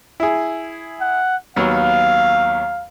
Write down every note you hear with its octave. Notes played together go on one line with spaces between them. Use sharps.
E4 G#4
F#5
D#2 F#3 B3 F5